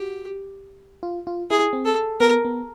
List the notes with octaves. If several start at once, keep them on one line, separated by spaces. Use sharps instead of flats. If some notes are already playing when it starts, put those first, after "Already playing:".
Already playing: F#4 G4
F4
F4
E4 G#4
C4
A4
B3 A#4
B3